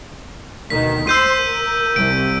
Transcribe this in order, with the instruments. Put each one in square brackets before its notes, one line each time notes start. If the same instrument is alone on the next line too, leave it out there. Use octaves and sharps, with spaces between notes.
[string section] D2 B2 D#3 [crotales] B6
[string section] C5 C6 [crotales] E6 G6 D#7
[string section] A#4
[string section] C2 [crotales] D7